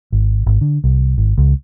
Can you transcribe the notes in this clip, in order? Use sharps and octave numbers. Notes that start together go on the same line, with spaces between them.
G#1
G#1
D3
C2
G#1
C#2